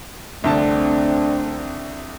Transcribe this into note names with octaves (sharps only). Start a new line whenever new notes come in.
C2 D3 A3 C4 D4 A5